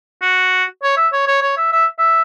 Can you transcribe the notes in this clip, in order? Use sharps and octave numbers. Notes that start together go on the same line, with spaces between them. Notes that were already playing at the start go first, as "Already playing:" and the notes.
F#4
C#5
E5
C#5
C#5
C#5
E5
E5
E5